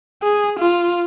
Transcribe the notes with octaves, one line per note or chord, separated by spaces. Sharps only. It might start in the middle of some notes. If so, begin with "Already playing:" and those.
G#4
F4